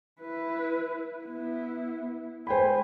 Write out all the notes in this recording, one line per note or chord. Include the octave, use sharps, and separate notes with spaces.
E4 B4
B3 E4
G#3 C5 G5 G#5 B5